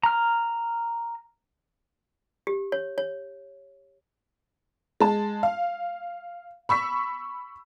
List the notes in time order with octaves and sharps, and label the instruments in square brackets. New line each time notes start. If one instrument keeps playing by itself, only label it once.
[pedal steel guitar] A#5 F6
[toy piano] G4
C#5
C#5
[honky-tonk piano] G#3 A5
F5
B5 C#6 E6 B6